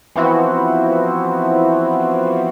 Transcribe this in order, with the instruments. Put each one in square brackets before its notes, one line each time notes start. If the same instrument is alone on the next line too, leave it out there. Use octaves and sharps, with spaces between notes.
[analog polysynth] E3 F3 B3 C4 E4 F#4